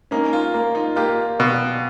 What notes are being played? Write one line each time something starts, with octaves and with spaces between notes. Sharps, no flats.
A#3 C#4 D#4
D#4 F4
A#3
D#4 F4
A#3 F4 G4
B2